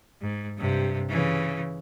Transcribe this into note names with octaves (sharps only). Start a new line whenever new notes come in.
G#2
G2 C3
C#3 E3